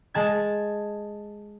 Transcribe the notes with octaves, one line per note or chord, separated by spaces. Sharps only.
G#3 A5 G#6